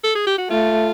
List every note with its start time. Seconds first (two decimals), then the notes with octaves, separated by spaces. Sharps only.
0.04 A4
0.15 G#4
0.27 G4
0.38 F#4
0.50 A3 F4